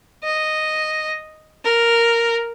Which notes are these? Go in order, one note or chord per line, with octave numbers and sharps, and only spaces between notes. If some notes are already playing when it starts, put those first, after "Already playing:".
D#5
A#4